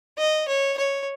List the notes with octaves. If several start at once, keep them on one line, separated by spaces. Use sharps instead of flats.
D#5
C#5
C#5